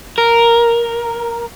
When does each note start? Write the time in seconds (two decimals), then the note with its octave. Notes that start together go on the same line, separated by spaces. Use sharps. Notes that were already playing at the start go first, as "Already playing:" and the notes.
0.18 A#4